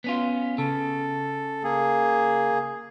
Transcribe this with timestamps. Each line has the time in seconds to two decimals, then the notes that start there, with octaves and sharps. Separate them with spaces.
0.04 B3 C#4 F4
0.58 C#3 A4
1.64 A#3 G#4